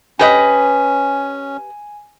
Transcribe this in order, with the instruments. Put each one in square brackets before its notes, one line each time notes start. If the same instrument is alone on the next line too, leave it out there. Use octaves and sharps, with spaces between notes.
[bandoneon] C#4 [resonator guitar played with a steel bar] G4 B4 D#5 [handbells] G#5